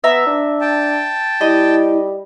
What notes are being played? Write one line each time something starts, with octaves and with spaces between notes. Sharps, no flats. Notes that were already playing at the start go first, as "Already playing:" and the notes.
B3 E5 A#5
D4
G5 A5
G3 E4 D#5